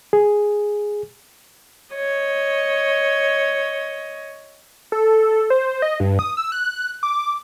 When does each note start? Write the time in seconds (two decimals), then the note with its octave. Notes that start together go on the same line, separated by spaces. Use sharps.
0.13 G#4
1.94 C#5 D#5
4.92 A4
5.50 C5
5.82 D#5
6.00 G2
6.19 D#6
6.37 E6
6.52 F#6
7.03 D6